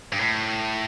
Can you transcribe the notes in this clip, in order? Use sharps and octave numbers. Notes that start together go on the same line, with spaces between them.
G2
A2